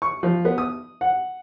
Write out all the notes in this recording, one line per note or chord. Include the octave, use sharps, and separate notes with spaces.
C#6
F3
B3
D#6
F#5